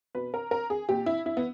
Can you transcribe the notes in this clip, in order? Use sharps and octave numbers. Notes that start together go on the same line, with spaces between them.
B2 B4
A#4
A#4
G#4
A#2 G4
E4
E4
B3